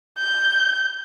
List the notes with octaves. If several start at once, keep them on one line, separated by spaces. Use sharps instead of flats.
G6